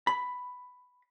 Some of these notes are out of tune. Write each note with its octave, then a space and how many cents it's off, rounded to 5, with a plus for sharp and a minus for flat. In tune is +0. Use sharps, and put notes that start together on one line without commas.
B5 +5